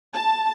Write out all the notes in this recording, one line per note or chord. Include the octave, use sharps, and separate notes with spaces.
A5